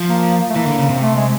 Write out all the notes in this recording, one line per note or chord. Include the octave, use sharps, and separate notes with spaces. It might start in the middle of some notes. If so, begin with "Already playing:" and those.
Already playing: F3
A#3
A3
E3 A#3
D3
C#3
C3
A3
G#3